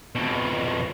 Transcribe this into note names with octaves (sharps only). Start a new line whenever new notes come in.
F2 B2